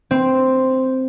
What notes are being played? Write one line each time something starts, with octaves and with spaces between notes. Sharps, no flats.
C4